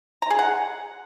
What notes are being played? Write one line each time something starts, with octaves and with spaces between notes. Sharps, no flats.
A#5
G#4
F#5